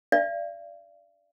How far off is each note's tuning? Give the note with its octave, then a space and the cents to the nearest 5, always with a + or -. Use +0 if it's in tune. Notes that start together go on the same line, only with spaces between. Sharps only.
D5 +0 F5 -45